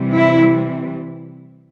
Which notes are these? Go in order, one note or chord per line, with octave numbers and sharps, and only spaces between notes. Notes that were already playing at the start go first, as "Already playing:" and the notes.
Already playing: C3 E3 G3
E4